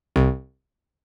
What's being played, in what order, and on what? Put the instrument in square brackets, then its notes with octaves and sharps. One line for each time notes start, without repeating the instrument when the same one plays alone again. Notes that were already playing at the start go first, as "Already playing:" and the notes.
[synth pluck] C2